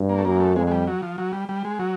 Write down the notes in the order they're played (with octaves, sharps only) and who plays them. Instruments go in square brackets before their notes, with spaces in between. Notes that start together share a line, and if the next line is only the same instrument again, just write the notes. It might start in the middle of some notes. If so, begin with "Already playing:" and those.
Already playing: [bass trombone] G2
[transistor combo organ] A#3
A3
[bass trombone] F#2 [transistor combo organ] A#3
[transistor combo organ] A3
[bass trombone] F2 [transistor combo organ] G#3
[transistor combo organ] G#3
G3
F#3
F3
F#3
G3
G3
G#3
F#3